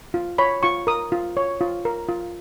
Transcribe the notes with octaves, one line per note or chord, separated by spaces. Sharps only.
F4
C#5 B5
F4 C#6
A#4 D#6
F4
C#5
F4
A#4
F4